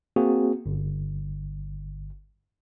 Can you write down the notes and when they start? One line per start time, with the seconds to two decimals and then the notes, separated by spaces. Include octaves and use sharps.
0.16 A#3 C4 F#4 G#4
0.66 G1